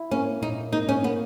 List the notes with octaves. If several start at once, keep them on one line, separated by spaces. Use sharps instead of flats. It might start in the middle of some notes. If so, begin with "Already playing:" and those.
Already playing: E4
A#3 C#4
A#2 D#4
A#3 D#4
C#4
A#3 B3